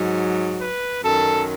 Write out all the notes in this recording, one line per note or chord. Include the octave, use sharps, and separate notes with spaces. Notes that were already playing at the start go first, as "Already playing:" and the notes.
Already playing: G#2 F#3
B4
F#2 D#3 F#3 A4